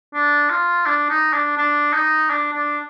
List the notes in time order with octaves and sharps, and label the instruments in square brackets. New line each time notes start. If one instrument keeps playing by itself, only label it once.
[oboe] D4
F4
D4
D#4
D4
D4
D#4
D4
D4